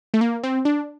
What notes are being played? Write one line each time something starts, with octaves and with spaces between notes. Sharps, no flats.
A3
A#3
C4
D4